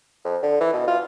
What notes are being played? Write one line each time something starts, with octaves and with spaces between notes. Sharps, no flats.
F2
D3
E3
B2
F4